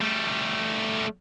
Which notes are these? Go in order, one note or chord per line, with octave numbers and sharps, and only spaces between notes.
G3 A3